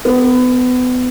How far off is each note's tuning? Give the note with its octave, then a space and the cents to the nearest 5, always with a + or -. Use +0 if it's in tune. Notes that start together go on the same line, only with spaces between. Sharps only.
B3 +30